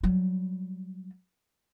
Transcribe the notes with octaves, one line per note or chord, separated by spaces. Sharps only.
F#3 G3